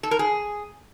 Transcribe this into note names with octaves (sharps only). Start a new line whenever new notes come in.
A4
A#4
G#4